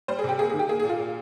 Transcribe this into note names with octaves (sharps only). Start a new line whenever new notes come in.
G3 C5
G#4
C3 G4
A#3 G#4
G#4
D#3
G4
A#3 G#4
G#4
A#2
F4
A#2